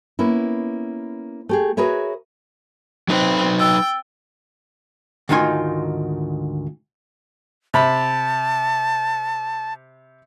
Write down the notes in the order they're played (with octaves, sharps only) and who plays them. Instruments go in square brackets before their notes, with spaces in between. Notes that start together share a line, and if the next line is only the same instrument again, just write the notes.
[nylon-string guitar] A#3 B3 C#4 E4
A3 G4 G#4
F#4 G#4 A#4 B4 C#5 E5
[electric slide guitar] F#3 D#4 B4 [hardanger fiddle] C4
[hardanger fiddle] G5 [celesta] E6 A6
[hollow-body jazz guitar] D2 G#2 D#3 D#4 F4 G#5
[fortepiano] C3 B5 [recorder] A5